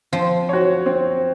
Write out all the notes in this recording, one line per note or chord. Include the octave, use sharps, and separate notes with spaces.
F3 C4
F#4 C#5
C4